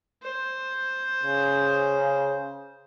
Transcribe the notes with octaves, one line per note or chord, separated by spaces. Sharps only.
C5
C#3